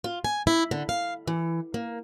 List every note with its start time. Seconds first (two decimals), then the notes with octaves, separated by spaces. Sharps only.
0.04 F4
0.24 G#5
0.47 E4
0.71 D3
0.89 F5
1.27 E3
1.74 A#3